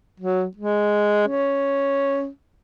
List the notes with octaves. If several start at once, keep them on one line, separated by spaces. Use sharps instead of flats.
F#3
G#3
C#4